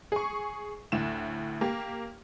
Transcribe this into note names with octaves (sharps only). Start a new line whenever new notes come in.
G#4 C#6
D2 A2 E7
A#3 G4